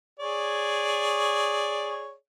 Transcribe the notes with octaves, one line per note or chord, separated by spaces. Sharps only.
G#4 C#5 D5